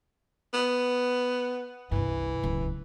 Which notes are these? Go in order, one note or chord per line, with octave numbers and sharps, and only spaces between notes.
B3
C2 G2 E3
D1 C#2